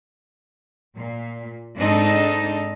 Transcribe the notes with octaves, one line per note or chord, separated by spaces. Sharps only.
A#2
G#2 C4 D4 D#4 A4 D#5